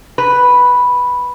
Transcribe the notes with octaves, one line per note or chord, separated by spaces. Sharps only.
B4